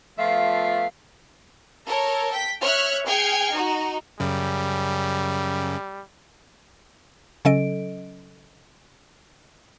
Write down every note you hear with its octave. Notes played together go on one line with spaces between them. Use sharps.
F3 A3 B3 F4 E5 F5
A4 A#4 C#5
G5 B6
C#5 E5 F6 F#6
G#4 G5 F6 G#6 C7 C#7
D#4 F#4
F#2 C#3 G3
C#3 F#3 C#4 A4 D#5 D7